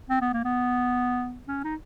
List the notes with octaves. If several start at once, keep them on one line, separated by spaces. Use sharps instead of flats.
C4
B3
A#3
B3
C#4
D#4